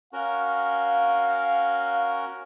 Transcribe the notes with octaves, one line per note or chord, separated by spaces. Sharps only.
C#4 F#4 A#4 F5